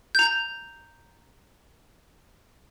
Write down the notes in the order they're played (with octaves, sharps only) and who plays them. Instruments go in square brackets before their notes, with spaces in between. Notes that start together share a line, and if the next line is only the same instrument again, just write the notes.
[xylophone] A#5 G6